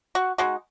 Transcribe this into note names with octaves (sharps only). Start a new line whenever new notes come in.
F#4
G#3 D#4 F#4